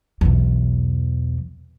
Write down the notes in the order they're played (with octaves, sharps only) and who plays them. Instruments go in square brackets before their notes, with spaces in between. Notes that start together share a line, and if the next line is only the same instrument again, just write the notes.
[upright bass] B1 E2